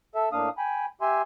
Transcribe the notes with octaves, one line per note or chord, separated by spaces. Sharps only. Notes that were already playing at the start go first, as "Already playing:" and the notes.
A4 E5
A2 A#3 D4 F5 D#6
G5 G#5 B5
G4 E5 G#5 C6